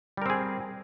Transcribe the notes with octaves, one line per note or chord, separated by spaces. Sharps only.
G3 C4 G#4 A#4